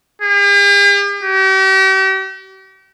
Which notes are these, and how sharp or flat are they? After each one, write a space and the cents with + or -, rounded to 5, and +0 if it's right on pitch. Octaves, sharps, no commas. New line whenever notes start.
G4 +45
G4 -40